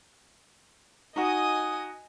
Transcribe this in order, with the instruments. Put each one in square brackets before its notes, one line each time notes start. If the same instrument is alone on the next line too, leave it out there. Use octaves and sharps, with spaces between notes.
[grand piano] D#4 F#4 [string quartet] D#5 G#5 D#6